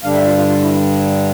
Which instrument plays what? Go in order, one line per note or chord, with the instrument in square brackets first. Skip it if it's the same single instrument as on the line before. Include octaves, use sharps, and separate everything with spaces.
[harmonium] G2 D3 G3 D4 F5
E5
F4
F4
F4
E4